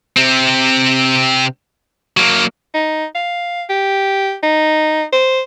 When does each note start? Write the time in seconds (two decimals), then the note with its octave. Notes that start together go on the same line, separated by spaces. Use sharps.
0.17 C3 C4
2.17 F#3 A#3
2.74 D#4
3.15 F5
3.70 G4
4.43 D#4
5.13 C5